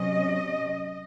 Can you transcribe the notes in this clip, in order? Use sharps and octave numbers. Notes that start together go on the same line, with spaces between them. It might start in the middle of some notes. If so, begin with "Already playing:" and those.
Already playing: C3 F#3 C#4 D#5